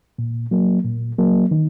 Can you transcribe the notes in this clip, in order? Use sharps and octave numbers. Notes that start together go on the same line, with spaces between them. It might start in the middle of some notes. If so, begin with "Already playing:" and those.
A#2
F#3 A#3
A#2
F#3 A#3
D#3